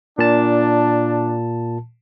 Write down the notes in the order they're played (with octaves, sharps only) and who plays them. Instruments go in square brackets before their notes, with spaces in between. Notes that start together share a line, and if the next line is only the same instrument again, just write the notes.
[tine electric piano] A#2 A5 [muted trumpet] D4